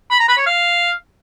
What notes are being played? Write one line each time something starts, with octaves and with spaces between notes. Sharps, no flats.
B5
A#5
B5
C#5
F5